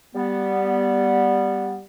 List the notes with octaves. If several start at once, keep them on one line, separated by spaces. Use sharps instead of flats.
G3 B3